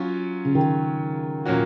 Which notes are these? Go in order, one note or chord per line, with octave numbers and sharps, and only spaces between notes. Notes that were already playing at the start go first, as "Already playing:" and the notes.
Already playing: F#3 C#4 F4
C#3
D#3
A#2 F#3 A#3 C#4 F#4